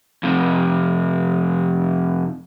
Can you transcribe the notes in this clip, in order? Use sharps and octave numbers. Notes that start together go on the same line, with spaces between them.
F2 C3